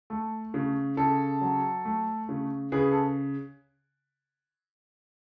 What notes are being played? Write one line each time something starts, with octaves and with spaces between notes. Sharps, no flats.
A3 A4
C#3
C#3 A4
F#3
A3
C#3
C#3 G#4 B4
A4